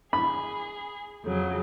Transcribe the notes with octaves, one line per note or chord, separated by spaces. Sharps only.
G#4 B5
F2 C#3 F#3